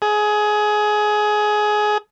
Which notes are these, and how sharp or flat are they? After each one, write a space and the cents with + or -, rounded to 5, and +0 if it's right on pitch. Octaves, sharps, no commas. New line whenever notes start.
G#4 +20